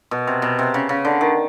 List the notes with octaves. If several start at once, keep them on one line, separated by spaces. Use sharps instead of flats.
B2
C3
B2
C3
C#3
C#3
D3
D#3